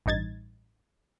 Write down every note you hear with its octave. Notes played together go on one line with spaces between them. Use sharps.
A1 G2 D#4 G#6 A6